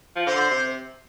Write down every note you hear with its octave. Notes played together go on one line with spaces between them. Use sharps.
F3
D3 C5
C3